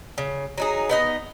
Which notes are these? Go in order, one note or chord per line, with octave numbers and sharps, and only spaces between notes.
C#3
F#3 D#4 G#4
B3 D#4 D#5